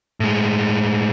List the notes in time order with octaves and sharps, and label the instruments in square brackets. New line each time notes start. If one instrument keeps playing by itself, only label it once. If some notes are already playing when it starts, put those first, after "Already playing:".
[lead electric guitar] A2 G#3